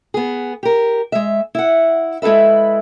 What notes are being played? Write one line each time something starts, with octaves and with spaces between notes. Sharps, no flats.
B3 G#4
G4 A#4
G#3 E5
E4 F#5
G#3 E4 A4 B4 E5